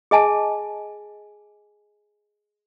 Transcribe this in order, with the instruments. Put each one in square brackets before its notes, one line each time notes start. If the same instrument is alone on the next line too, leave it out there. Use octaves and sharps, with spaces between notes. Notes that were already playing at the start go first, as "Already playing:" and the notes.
[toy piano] G#4 D#5 G#5 A5